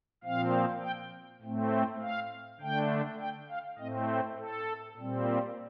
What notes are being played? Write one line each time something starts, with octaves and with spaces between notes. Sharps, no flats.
A#2 F3 C4 F5
G5
A2 A3 C4
F5
D3 A3 D4 G5
G5
F5
A2 A3 C4 D#5
C5
A4
A#2 G3 C4